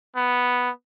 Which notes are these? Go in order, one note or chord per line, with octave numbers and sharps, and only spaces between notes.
B3